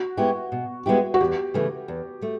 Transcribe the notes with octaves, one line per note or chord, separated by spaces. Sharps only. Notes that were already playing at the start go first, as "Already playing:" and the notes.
Already playing: F#4
G#3 B3 E4 G4
B2
G#3 B3 E4 G4
F#4
E2 G4
C#3 E3 A3
E2
A3